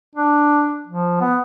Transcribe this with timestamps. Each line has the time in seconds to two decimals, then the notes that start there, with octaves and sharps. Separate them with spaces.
0.15 D4
0.87 F3
1.21 B3